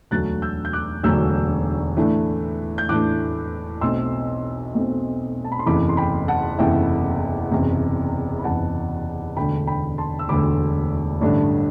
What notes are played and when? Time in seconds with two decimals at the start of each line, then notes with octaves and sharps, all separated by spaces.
0.11 E1 D2 D3 F#3 A3 F#6 A6
0.42 E6 G6
0.65 G6
0.73 D6 F#6
1.04 E1 D2 D3 F#3 A3 E6 G6
1.97 A2 E3 A3 D4
2.78 G6
2.89 A2 E3 A3 D4 D6 F#6
3.81 B1 B2 A3 C4 C6 E6
4.74 B1 B2 A3 C4
5.45 A5
5.52 B5
5.59 C6
5.66 F#1 E2 C3 E3 A3 B5 D6
5.89 C6
5.97 G5 B5
6.28 F#5 A5
6.59 F#1 E2 C3 E3 A3 E5 G5
7.51 F#1 E2 C3
8.39 B5
8.44 F#1 E2 C3 F#5 A5
9.37 E1 D2 D3 A3 G5 B5
9.67 G5 B5
9.98 A5 C6
10.19 E6
10.29 E1 D2 D3 A3 B5 D6
11.21 A1 G2 D3 A3 D4